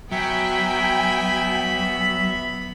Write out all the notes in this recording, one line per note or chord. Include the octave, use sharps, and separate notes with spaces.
F#3 B3 E5 G5 G#5 B5